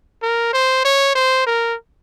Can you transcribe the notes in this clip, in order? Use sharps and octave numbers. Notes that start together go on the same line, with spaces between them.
A#4
C5
C#5
C5
A#4